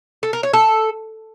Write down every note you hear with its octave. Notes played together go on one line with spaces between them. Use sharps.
A4
A#4
C#5
A4